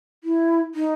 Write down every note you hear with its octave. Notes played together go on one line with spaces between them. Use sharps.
E4
D#4